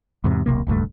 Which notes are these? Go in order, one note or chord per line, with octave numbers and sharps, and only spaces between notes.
E2 G#2 C3
D#1 B1 C3 A#3
D#1 C#2 G2 A3